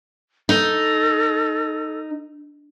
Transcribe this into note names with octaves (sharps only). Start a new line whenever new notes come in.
D#4 A4